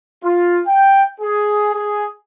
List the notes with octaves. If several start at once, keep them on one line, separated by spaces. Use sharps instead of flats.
F4
G5
G#4
G#4